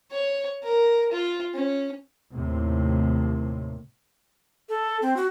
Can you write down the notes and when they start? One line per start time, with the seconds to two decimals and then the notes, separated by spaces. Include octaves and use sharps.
0.11 C#5
0.63 A#4
1.12 F4
1.54 C#4
2.33 D#2 A2 C3
4.69 A4
5.02 C4
5.17 F#4